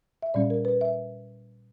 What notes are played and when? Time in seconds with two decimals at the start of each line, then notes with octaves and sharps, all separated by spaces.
0.22 E5
0.34 A#2 G3 C#4 D5
0.50 A#4
0.65 B4
0.81 E5